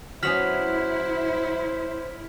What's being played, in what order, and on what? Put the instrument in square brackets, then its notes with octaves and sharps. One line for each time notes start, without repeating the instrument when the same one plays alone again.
[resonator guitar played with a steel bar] F#3 B3 C#4 [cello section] E4 [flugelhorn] C5 [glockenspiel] F6 B6 F#7